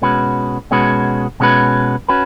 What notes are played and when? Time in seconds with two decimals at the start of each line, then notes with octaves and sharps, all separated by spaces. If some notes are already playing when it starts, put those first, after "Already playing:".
0.02 B2 G#3 C#4 F#4 B4
0.71 B2 G#3 C#4 F#4 B4
1.40 B2 G#3 C#4 F#4 B4
2.09 C#4 F#4 B4